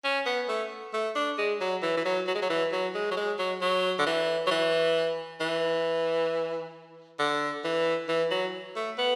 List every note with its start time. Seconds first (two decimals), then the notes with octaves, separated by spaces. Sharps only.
0.04 C#4
0.26 B3
0.49 A3
0.94 A3
1.15 D4
1.38 G#3
1.61 F#3
1.83 E3
1.97 E3
2.05 F#3
2.27 F#3
2.35 G#3
2.42 F#3
2.50 E3
2.72 F#3
2.95 G#3
3.11 F#3
3.17 G#3
3.39 F#3
3.61 F#3
3.99 D3
4.06 E3
4.47 F#3
4.51 E3
5.41 E3
7.19 D3
7.64 E3
8.09 E3
8.31 F#3
8.76 A3
8.98 B3